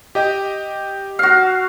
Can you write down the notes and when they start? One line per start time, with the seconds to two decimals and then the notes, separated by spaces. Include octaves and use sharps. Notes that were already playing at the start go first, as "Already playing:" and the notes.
0.15 G4 D#5 G5
1.19 F#4 F5